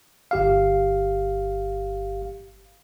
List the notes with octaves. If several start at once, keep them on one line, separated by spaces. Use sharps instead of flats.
G1 G4 F5